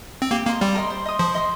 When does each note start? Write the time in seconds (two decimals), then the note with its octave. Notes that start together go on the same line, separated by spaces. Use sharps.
0.22 C4
0.31 A#3 G4
0.46 A#3 A#4 D#5 C6
0.61 G3 G4
0.75 A#4 D#5 C6
0.90 C5
1.05 D#5 C6 D#6
1.19 F3 C5
1.35 D#5 C6 D#6